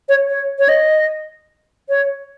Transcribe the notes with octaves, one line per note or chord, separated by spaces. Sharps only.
C#5
C#5
C#5
D#5
C#5